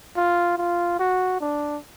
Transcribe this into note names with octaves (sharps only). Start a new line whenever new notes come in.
F4
F4
F#4
D4